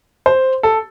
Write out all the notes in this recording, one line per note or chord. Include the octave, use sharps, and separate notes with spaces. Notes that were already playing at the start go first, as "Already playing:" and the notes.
C5
A4